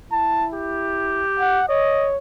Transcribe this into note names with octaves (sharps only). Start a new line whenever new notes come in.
E4 A5
G4
F#5
C#5 D#5